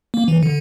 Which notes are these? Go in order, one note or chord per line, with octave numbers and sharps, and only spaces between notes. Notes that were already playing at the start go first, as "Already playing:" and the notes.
A#3
E3
D3